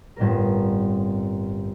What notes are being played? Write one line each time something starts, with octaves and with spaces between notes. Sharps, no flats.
G1 A2 C4 A#4